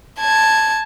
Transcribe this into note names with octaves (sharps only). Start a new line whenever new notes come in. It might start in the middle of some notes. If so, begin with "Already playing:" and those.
A5 G#6